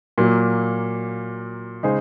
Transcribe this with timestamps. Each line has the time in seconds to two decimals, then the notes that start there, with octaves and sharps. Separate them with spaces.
0.18 A#2 F#3 A#3
1.83 C#3 G#3 D#4 G#4 C5